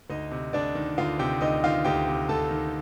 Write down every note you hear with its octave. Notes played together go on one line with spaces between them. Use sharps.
D2 D#4 D#5
C3
D2 D4 D5
D#3
D2 F4 F5
C3 G4 G5
D2 D#4 D#5
D#3 F4 F5
D2 G4 G5
C3
D2 A4 A5
D#3